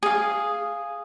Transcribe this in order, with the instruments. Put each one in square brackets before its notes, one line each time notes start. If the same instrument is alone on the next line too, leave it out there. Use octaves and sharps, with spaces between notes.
[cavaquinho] G#4 F5